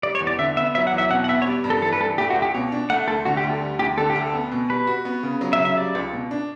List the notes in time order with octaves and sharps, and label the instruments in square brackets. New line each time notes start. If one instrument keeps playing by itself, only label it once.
[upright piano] G3 [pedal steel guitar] D5
[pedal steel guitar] C#5
[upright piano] E2
[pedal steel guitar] D5
[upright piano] D3 [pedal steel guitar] E5
[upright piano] B3 [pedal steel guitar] E5
[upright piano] F#3 [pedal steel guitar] E5
[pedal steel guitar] F#5
[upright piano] E2
[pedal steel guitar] E5
[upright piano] B2 [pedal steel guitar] F#5
[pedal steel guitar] F#5
[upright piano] B3 [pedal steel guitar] E5
[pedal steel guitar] C#5
[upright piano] G3 [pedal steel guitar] D5
[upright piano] G2
[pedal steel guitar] A4
[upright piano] E3 [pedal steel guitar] A4
[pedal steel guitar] B4
[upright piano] G2 [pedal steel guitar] A4
[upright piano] A3 [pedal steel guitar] G4
[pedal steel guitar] F#4
[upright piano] C#2
[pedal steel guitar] G4
[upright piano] B2 [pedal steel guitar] C#5
[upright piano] D4
[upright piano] A3 [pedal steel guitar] F#5
[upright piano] D2 [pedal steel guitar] A4
[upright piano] D3 [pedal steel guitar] F#4
[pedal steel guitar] G4
[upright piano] D2
[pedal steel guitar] A4
[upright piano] G3
[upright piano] D2 [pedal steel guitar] G4
[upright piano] D3 [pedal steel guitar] A4
[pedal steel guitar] G4
[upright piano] D2
[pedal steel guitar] A4
[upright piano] B3
B2
[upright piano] G3 [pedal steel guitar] B4
[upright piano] F#4
B3
C#3
F#3
[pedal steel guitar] E5
[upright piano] C#3
[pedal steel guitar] E5
[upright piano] G3 [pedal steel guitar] D5
[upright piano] C#2
B2
D4